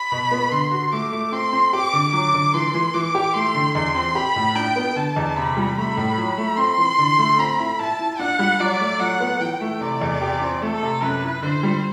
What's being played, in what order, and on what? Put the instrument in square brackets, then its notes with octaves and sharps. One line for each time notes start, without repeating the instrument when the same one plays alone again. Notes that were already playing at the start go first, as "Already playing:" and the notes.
Already playing: [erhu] B5
[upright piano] B2
B3
[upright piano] D3 [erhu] C6
[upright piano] F#4
[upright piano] A3 [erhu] D6
[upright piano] A3
[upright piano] C4 [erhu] C6
[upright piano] C4
[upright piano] G4 [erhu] D6
[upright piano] D3
[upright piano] F#3 [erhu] D6
[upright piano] D3
[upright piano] E3 [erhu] C6
[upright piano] E3
[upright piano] E3 [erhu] D6
[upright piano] G4
[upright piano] A3 [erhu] C6
[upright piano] D3
[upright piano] E2 [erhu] C6
[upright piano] C4
[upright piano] G4 [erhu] B5
[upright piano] A2
[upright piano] D4 [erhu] G5
[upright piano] B3
[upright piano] D3 [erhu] A5
[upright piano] E2
[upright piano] C3 [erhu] B5
[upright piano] G3
[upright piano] A3 [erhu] B5
[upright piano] A2
F#3
A3
[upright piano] C4 [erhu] C6
[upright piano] E3
D3
A3
[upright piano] C4 [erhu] B5
[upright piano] E4
[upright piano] E4 [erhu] A5
[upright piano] E4
[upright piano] D4 [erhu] F#5
[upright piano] G3
[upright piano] F#3 [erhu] D5
[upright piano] A3
[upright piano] F#3 [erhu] F#5
[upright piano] B3
[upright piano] E3 [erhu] G5
[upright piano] A3
[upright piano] C3 [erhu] D5
[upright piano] E2
G4
C4
[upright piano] A3 [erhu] A4
[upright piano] C3
[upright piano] F#2 [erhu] B4
[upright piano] E4
[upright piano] D3 [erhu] C5
[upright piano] G3